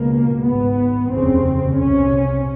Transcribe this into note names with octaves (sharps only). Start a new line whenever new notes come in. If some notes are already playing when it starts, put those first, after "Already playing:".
Already playing: C#2 B2 A#3
G#1 G#2 B3
F1 D#2 C#3 C4
C2 C3 C#4